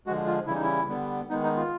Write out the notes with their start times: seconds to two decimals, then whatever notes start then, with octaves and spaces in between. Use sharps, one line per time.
0.06 D3 F3 G#3 F#4
0.27 F4
0.47 C#3 E3 G3 E4
0.55 D#4
0.63 E4
0.89 D3 G3 B3
1.29 D#3 G#3 B3 D#4
1.44 D#4
1.57 F4